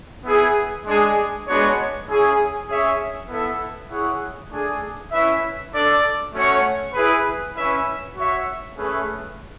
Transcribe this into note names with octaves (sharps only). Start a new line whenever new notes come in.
B3 E4 G#4
G#3 D4 G#4
G#3 B3 D4 F#4 C#5
C#4 E4 G#4
C#4 G#4 C#5 E5
B3 E4 A4 E5
E4 G#4 C#5 F#5
A3 D4 G#4
C#4 E4 B4 E5
D4 A4 D5
A3 C#4 F#4 C#5 F#5
E4 G#4 B4
C#4 E4 B4 E5
F#4 C#5 E5
A3 C#4 G#4 B4 E5